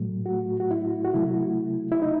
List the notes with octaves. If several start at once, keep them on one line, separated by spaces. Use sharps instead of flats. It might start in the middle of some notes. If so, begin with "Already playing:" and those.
Already playing: A2 F#3 A3
F#4
F#4
E4
F#4
C3 F#3 A3 E4
E4
D#4